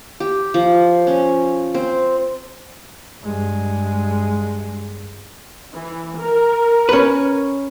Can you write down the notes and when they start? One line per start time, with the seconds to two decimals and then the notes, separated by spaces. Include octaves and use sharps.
0.20 G4
0.54 F3
1.07 C#4
1.74 C4
3.22 G2 G#3
5.74 E3
6.16 A#4
6.89 C#4 B4